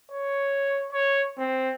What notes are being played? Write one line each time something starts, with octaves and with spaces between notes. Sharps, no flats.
C#5
C#5
C4